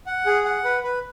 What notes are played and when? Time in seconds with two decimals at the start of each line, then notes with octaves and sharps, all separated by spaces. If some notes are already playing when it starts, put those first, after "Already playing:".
0.07 F#5
0.26 G#4
0.45 F#5
0.65 B4
0.83 B4